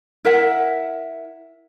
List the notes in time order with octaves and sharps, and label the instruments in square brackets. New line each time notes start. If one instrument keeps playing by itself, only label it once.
[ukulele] E4 A#4 E5 F#5